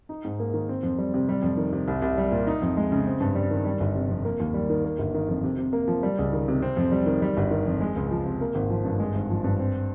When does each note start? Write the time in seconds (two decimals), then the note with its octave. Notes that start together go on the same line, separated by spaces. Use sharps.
0.09 D#4
0.25 G#2
0.40 A#3
0.54 D#3
0.69 C4
0.83 F2
0.98 G3
1.14 C3
1.29 G3
1.42 F2
1.57 D#3
1.73 C3
1.88 C2
2.02 C2
2.18 G3
2.31 A#2
2.47 D#4
2.62 F2
2.77 G#3
2.92 C#3
3.06 C4
3.21 G2
3.35 G3
3.51 D#3
3.65 G3
3.80 G1
3.95 C3
4.10 F2
4.25 A#3
4.40 D#2
4.54 G3
4.70 D#3
4.85 A#3
4.99 G1
5.14 D#3
5.29 F2
5.44 C3
5.58 C3
5.73 A#3
5.88 F3
6.03 G3
6.19 C#2
6.33 D#3
6.48 C3
6.62 C4
6.77 F2
6.92 G3
7.06 D#3
7.22 G3
7.37 G1
7.51 D#3
7.66 F2
7.81 G#3
7.96 C#2
8.11 F3
8.26 C3
8.41 A#3
8.55 G#1
8.70 F3
8.85 G2
9.00 G#3
9.15 G#1
9.30 F3
9.44 G2
9.59 C4